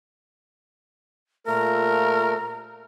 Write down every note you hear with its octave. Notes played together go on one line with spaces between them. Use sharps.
A#2 A3 F4 A#4 A#5